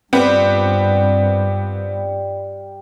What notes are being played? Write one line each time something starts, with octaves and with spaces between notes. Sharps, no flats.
G2 G3 B3 C4 F4